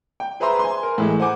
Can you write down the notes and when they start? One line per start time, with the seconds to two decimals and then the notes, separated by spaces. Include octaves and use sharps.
0.20 G5
0.40 G#4 B4 C5 E5 A#5 C6
0.59 G#5 C6
0.83 A#4
0.98 A2 E3 G#3
1.20 C5 F#5 G#5 D6